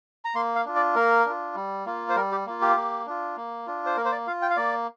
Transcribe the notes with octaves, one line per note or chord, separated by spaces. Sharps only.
A#5
A#3 C6
F5
D4 F4
D5
A#3 A#4
D4 F4
G3
A#3 F4
C5
G3 A#4
G4
A#3 F4
G4
A#3
D4 F4
A#3
D4 F4
C5
A#3 A#4
C5
D5
F4 F5
G5
F5
A#3 D5